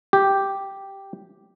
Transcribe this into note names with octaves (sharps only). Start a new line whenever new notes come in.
G4